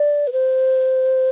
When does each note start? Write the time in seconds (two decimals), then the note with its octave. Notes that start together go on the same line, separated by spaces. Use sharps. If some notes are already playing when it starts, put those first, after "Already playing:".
Already playing: D5
0.27 B4
0.33 C5